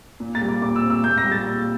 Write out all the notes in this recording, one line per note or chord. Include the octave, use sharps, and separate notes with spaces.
A#2
A6
G3
D6
A#2 D6
E6
C4
E6
A#2 G6
A#6
G3
A6
A#2